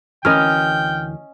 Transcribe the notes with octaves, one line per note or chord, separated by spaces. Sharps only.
D2 E3 C#4 A#4 D#5 G5 F6